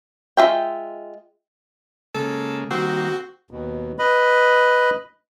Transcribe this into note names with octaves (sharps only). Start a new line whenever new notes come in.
G#3 F4 G#4 E5 G5
C#3 G#3 A#3 A4
D#3 G3 A#3 C4 F#4
D#2 B2
B4 D#5 B5